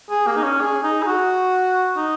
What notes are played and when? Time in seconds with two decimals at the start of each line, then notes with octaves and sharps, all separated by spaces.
0.10 G#4
0.27 A#3
0.36 D#4
0.43 C#4
0.61 G#4
0.83 D#4
1.03 G#4
1.07 F#4
1.97 D#4